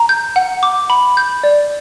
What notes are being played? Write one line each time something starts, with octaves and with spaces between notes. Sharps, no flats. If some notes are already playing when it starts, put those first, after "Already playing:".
Already playing: A#5
G6
F#5
D6
B5
G6
D5